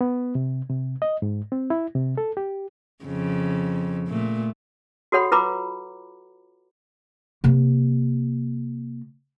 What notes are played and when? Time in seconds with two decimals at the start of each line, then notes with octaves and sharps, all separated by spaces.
0.01 B3
0.35 C3
0.69 C3
1.02 D#5
1.22 G#2
1.52 C4
1.70 E4
1.95 C3
2.18 A4
2.37 G4
3.05 F2 C#3
4.08 A#2 A3
5.12 F#4 A4 C#5 F#5 B5
5.32 F4 B4 A#5 B5 D6
7.44 C3 A#3